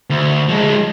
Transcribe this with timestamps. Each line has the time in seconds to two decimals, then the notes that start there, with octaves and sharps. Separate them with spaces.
0.10 D2
0.49 F3 G#3